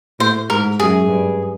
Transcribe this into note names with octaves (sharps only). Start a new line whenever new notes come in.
A2 C5
G#2 A#4
F#2 G#4
G2